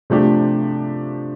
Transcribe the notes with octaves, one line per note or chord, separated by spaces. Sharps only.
C3 F3 A3 D4 G4